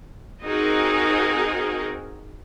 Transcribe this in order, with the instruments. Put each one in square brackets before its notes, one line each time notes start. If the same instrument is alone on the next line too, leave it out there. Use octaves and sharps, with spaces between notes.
[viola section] C4 D#4 F#4 G#4 A#4 D#5